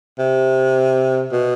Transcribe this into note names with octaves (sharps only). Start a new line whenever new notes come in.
C3
B2